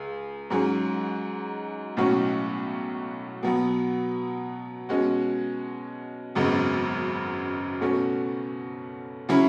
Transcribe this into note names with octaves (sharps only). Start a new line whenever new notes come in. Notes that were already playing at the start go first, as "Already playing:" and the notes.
Already playing: C#2 G#4
G#2 F#3 C#4 G#4
B1 A2 F#3 C#4 F#4
B2 F#3 B3
B2 G#3 C#4 F#4
G#1 F#2 C#3 G#3 B3
B2 A3 C#4 F#4
C#3 F#3 C#4 E4